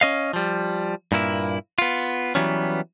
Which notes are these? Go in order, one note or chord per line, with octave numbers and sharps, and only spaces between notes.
C#4 D#5 F5
F3 G3
G2 A#2 A#3 E4
B3 F4
E3 F#3 G3 B3 C#4